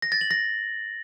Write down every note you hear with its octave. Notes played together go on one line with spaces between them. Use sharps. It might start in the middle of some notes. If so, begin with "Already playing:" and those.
A#6
A6
F#7
A#6